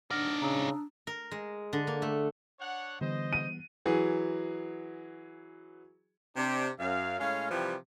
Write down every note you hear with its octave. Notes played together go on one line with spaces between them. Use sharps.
D4 D#4 D5 F#5 F6 A#6
C#3 A#5 D#6 E6
A#4
G#3
D3
A#3
A3
D4 C#5 F#5
D3 E3 G3 B3 C5 D#5
D#7
E3 F#3 G#4
C3 D4 G4
F#2 F5
A2 G#3 C#4 F5
C3 E3 F3 G3 G4